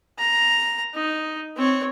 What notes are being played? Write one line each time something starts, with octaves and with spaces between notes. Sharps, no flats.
A#5
D#4
C4 C#5